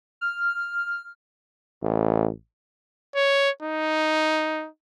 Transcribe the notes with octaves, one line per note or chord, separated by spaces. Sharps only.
F6
A1
C#5
D#4